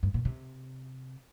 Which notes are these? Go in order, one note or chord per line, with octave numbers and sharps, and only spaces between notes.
G2
A#2
C3